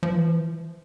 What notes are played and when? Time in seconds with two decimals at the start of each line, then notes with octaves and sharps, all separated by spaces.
0.03 F3
0.14 E3